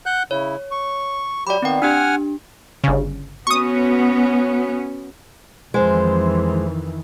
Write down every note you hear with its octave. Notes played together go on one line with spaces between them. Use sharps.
F#5 F#6 G6
C#3 E4 C#5
C#6
F#3 G4 D5 B5
D#3 B3 C4 G5
D4 G4 F#5 G#5 F6
G1 C#3
B3 C#4 F#4 C#6 D#6
F2 D#3 E3 G#3 C5